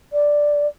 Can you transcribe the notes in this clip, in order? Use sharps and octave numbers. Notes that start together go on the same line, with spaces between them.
D5